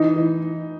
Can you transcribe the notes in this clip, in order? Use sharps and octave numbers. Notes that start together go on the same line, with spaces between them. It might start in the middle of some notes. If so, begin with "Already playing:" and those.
Already playing: E3 D#4
E3